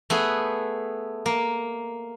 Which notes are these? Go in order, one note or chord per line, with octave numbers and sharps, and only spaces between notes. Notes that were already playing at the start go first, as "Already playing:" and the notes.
A3 B3 G#4
A#3